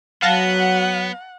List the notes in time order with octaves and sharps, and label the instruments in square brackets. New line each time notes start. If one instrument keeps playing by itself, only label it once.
[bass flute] F#3 [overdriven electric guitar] B3 [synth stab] F5 A5 A#6 [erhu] F#5